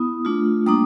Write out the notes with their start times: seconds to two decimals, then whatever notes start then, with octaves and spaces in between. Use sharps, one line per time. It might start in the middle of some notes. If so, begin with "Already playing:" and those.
Already playing: B3 E4 D#6
0.25 A3 D4 F4
0.66 G3 A#3 D4 D#6